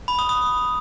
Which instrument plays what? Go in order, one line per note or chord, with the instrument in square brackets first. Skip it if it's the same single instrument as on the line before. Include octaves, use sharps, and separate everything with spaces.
[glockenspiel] B5
D#6
D#6